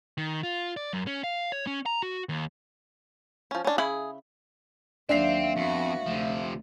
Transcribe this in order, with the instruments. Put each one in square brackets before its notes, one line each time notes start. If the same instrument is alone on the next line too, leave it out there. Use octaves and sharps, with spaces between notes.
[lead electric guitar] D#3
F4
D5
F#2
C#4
F5
C#5
C#4
A#5
F#4
D#2
[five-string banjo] F3 C#4
C#4 D4
[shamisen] C#3 E4 B5 [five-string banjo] G#4
[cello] D#2 F#3 [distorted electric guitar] C4 [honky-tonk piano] D4 C7 [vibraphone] E5 F5
[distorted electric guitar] F2 [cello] B3 F#4
[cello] D2 [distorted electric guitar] C3 F3